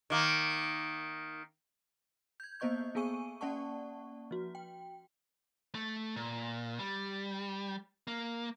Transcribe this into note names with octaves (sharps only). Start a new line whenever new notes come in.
D#3 A#3
G6 G#6
A#3 B3 C5 D#5 C#6 G6
A#3 B3 G#4 G#5 C#6 D#7
A#3 C#4 D5 F#5 A5 C#6
F3 F#4
G5
A3
A#2
G3
A#3